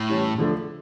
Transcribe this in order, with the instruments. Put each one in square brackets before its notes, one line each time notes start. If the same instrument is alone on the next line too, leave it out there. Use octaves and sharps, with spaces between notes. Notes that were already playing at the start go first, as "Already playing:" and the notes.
Already playing: [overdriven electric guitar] A2
[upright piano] E3 G3 C#4
D3 F3 A3 D4